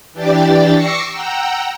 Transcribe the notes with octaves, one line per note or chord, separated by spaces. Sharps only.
E3 D4 G4 D5 G5 A6
C#6 D6 E6 A#6 C7 C#7
F#5 G5 A#5 E6